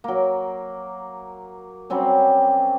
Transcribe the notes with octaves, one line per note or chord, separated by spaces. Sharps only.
F#3 A#3
F#3 G3 C4 C#4